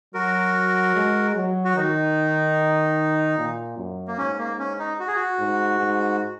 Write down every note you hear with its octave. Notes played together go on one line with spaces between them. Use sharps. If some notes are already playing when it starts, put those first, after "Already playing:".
F#3 F#4 A#4
G#3
F#3
F#4
D#3 D#4
A#2
F#2
A#3
G#2 C#4
A#3
C#4
D#4
F#4
G#4
F#4
G#2
G#2